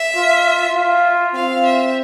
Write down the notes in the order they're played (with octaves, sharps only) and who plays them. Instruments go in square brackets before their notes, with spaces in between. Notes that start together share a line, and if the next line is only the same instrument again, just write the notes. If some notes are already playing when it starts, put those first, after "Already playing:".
Already playing: [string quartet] E5
[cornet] F4
F4
[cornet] C4 [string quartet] F5
[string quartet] E5